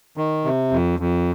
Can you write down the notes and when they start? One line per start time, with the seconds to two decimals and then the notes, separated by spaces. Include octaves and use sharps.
0.17 D#3
0.45 C3
0.72 F2
1.00 F2